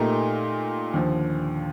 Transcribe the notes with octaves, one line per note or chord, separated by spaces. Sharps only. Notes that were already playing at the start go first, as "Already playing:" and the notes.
Already playing: A#2 A3 D#4 G4 A#4
D#2 D3 F3